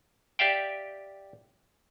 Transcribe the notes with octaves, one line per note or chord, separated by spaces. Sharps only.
G4 D5 E5 F5 G5